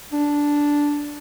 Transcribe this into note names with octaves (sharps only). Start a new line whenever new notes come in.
D4